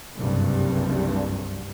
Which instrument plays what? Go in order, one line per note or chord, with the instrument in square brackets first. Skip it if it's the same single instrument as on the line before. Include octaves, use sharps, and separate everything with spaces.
[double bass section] F#1 C2 G2